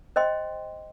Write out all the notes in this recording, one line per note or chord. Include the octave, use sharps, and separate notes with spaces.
C5 D#5 G5 C6